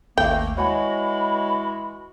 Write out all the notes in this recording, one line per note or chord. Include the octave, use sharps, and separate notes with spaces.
G#1 D#2 A3 A#3 G5
E3 G#3 F#4 C#5 F#5 G#5 B5